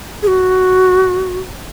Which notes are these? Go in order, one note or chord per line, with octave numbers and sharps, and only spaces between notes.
G#4
F#4